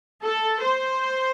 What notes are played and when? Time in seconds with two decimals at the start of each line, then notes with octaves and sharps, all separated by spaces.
0.24 A4
0.63 C5